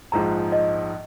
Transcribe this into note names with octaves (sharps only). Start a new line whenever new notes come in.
A#1 G#2 F3 G#3 A#5
D#5